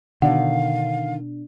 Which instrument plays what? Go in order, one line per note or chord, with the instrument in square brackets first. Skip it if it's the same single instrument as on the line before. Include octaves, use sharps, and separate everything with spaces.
[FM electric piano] B2 D4 [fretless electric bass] D3 D#3 [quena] F5 [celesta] F#5